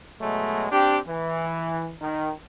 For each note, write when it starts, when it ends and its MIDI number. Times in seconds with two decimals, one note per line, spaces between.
0.21 0.67 47
0.21 0.67 54
0.21 0.67 56
0.21 0.67 57
0.72 0.98 60
0.72 0.98 62
0.72 0.98 67
1.07 1.91 52
2.01 2.30 51